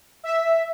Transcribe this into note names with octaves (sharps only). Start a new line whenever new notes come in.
E5